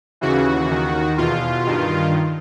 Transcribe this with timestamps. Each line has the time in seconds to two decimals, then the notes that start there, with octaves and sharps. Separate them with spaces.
0.21 D#2 C#3 E3 F#4
0.71 D#2 D#3
1.18 E2 B2 F4
1.67 G2 D#3